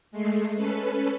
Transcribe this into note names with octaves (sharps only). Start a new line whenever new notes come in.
G#3 A3 C7
C#4 A4 B4